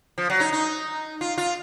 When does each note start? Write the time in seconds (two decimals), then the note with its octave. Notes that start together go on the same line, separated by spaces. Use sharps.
0.18 F3
0.30 F#3
0.40 D#4
0.52 D#4
1.21 F4
1.38 F4